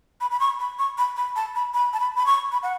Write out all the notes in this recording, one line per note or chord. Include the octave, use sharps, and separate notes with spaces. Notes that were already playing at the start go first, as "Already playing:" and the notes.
B5
B5
C#6
B5
C#6
B5
B5
A5
B5
B5
A5
B5
B5
C#6
B5
F#5